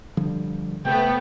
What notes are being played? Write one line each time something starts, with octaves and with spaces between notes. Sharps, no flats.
D3 F3 G3
C3 A3 B3 G5